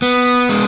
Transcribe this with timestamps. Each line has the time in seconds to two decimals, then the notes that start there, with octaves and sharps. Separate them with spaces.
0.02 B3
0.49 G#3